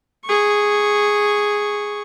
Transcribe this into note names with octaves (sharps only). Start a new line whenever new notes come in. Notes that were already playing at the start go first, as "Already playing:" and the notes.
G#4 C#6